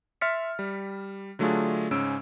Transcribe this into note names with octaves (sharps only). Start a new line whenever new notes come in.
E5 C6 F6 A6 B6 C#7
G3
D3 F#3 A3 D4 F4 G#4
G#2 C#3 C#4 E6 D7